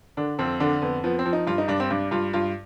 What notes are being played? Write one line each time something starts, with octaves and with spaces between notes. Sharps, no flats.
D3 D4
F2 C4
D3 D4
F2 B3
F3 B3
C4
F3
D#4
G2 F4
D#4
G2 D4
C4
G2 D4
G2 F4
G2 F4